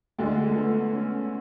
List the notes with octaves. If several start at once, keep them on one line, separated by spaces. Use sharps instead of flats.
D2 D3 G#3 A3
A3
B3
C#4